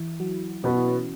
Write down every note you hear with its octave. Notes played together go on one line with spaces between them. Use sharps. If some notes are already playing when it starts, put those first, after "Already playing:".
Already playing: E3 E4
F#3 F#4
B2 B3 C#4 F#4
E4
C#4